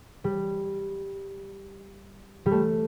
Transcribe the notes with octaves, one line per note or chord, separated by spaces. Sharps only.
G3
G3
A3